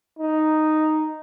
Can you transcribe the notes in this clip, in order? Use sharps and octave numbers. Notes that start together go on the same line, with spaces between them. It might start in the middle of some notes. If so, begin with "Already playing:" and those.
D#4